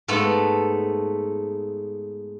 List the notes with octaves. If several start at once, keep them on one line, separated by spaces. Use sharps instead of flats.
G#2 A3 B3 A4